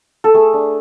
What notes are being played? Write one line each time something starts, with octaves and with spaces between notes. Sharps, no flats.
A4
A3 G#4
D4